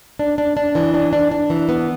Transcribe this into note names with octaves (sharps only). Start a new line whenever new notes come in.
D4
D4
D4
E3
D4
D4
D4
E3
B3